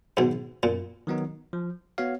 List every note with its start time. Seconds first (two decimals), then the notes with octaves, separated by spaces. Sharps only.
0.17 G#2 B2 D#3 F#3 B3 D#4
0.63 F#2 A#2
1.07 D#3 F#3 B3 D#4
1.53 F3
1.98 B3 F#4 C#5 F5